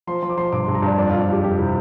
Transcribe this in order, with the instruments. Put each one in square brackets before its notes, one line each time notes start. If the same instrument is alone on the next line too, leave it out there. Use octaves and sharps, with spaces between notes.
[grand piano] F3 C6
F3 C6
D6
F3 C6
G2 D6
G2 C6
A#5
G2 D5
F2 D5
F4
F2
F4
F2 G4
F2 G4
C3 E4